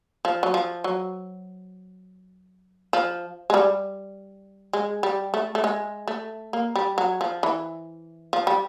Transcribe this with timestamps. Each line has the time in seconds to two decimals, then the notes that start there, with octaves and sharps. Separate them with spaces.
0.25 F3
0.43 F#3
0.54 F3
0.84 F#3
2.93 F3
3.50 G#3
3.54 G3
4.73 G#3
5.03 G3
5.34 A3
5.55 A3
5.64 G#3
6.07 A3
6.53 A#3
6.76 G3
6.98 F#3
7.21 F3
7.43 E3
8.33 F3
8.47 G3